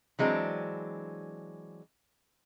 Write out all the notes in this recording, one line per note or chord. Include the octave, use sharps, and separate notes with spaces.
E3 F#3 G#3 C4 D4